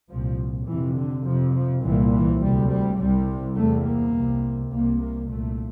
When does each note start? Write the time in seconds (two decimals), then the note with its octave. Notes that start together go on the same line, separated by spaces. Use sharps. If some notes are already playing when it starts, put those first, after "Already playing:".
0.10 C2 A#2 F3
0.68 F2 C3 E3
0.97 D3
1.26 F2 C3 F3
1.55 F3
1.83 C2 A#2 E3
2.13 E3
2.42 D2 C3 G3
2.70 G3
2.99 C2 C3 G3
3.56 E2 C3 A3
3.86 A#3
4.14 C2 C3
4.71 C2 C3 A#3
5.01 A#3
5.29 C2 A#2 A3